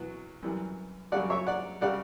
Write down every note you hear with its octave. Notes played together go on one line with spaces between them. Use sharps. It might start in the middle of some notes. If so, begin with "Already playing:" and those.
Already playing: E2 B2 F#3
F#2 E3 G3
F#2 C#3 G3 D5 F#5
C#5 E5
D5 F#5
C#3 G3 D5 F#5